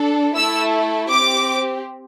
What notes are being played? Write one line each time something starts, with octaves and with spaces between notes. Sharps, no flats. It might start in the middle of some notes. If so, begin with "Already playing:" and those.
Already playing: D4 A4
A3 E4 A4 E6
C4 G4 D6